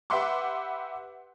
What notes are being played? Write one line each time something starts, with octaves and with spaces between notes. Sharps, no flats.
G4 B4 E5 F#5 C6 D6